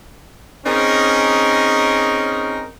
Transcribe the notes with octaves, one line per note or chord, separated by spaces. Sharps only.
C4 C#4 D#4 G#4 A#4